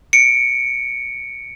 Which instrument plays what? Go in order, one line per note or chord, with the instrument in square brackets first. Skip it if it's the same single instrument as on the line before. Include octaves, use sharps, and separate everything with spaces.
[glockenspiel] C#7 D7